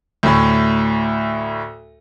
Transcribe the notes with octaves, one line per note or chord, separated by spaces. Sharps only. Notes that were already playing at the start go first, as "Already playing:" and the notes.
D2 A2